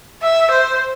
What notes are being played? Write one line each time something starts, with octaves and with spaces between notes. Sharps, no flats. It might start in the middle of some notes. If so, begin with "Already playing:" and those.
E5
C5